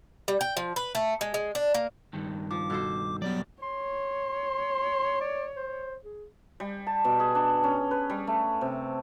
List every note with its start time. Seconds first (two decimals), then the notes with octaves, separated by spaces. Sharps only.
0.28 G3
0.41 G5
0.57 F3
0.76 B4
0.95 A3
1.21 G#3
1.34 G#3
1.55 D4
1.74 A#3
2.13 G2 D#3
2.51 F3 D6
2.70 B2 A4 C5
3.22 F#2 F#3 G3 B3 D5
3.62 C#5 C6
5.21 D5
5.56 C5
6.04 G#4
6.60 G3
6.87 A5
7.05 B2
7.20 G#4
7.35 D4
7.64 C#4
7.91 B4
8.10 G3
8.27 A3
8.61 C3